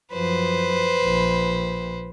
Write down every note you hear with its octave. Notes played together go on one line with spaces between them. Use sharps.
F#2 F3 B4 C5
A#1